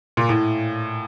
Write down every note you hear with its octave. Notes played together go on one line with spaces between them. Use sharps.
A#2
A2